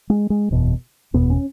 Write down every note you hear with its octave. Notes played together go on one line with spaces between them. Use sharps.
G#3
G#3
F#1 E2 B2
F#1 E2 B2 B3
C#4